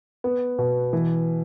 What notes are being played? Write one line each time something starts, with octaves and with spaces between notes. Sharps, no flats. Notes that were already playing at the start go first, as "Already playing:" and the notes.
B3
B2
E3